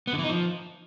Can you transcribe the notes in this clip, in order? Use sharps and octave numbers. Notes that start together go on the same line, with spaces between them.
B3
D3
E3
D#4
F3